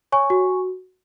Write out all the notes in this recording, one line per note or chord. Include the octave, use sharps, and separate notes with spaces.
C#5 G#5 C#6
F#4